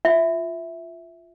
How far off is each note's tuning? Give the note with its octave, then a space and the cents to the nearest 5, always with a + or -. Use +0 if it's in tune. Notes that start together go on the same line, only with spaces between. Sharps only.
F4 +0 E5 +0